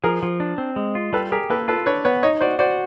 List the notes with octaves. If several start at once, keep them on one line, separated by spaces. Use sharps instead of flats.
F3 G#4 A#4
F3
D4
C4
G#3
F4
G3 A4 B4
G4 G#4 A#4
A#3 A4 B4
F4 A4 B4
D4 B4 C#5
B3 B4 C#5
D#4 C#5 D#5
F#4 C5 D5
F#4 C5 D5